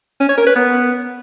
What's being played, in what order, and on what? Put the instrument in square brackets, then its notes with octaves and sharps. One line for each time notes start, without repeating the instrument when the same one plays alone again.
[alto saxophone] C#4
C#5
A#4
B4
B3